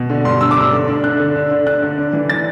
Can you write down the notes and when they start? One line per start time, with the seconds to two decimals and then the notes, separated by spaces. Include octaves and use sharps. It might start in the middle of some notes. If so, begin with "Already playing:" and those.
Already playing: B2
0.10 D3
0.25 G2 C6
0.41 G2 E6
0.51 D6
0.56 G2 E6
0.72 D3
0.88 D4
1.04 D3 F#6
1.20 D3
1.35 D4
1.51 D3
1.66 D3 F#6
1.82 D3
1.98 D4
2.13 E3
2.29 D4 A6